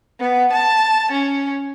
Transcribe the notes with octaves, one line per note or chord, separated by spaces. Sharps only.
B3
A5
C#4